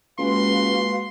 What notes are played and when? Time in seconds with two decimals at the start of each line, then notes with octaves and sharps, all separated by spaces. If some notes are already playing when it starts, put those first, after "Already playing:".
0.18 C#2 G#3 A#3 F#4 B4 F5 C6